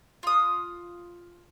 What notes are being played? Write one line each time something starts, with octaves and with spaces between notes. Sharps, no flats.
F4 D#6